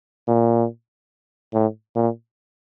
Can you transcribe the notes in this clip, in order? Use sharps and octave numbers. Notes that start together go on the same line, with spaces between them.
A#2
A2
A#2